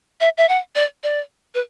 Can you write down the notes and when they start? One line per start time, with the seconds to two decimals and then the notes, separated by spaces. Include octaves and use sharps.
0.20 E5
0.38 E5
0.49 F#5
0.75 D5
1.03 D5
1.55 B4